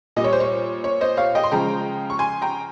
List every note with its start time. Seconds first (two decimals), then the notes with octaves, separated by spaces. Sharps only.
0.16 A#2 G3 D#5
0.24 C#5
0.33 C5
0.40 C#5
0.84 C#5
1.01 C5 D#5
1.17 C#5 F5
1.35 D#5 G5
1.43 C6
1.51 C#3 F3 G#3 G5 A#5
2.10 C#6
2.19 G#5 C6
2.42 G5 A#5